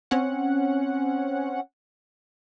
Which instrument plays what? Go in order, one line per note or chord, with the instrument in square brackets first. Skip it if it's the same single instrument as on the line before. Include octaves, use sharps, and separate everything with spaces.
[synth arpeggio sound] C4 C#4 F#5